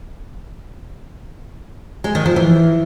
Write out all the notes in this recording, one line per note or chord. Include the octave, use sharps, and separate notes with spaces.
G#3
D#3
F3
E3